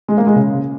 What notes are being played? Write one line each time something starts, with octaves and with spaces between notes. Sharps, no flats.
G#3
A#3
G#3
C#3